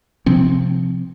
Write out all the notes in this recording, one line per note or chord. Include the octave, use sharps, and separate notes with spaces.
C3 F3 C4